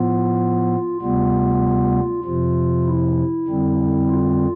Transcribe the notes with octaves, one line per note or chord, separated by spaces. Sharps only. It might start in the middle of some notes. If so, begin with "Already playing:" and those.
Already playing: A2 F3 B3 F4
D2 C3 G3 B3 F4
F2 C3 F3 F4
E4
F2 D3 G3 C4
F4